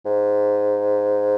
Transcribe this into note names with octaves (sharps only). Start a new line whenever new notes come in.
G#2